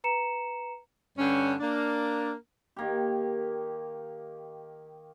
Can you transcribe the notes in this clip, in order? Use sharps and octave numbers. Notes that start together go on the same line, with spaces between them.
B4 A#5 C#7 E7
G2 D3 C#4
A#3 D4
D#3 A#3 G4